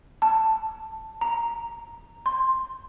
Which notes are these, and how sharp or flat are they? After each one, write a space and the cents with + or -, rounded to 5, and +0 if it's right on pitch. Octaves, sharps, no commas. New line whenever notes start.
A5 +5
A#5 +0
C6 +5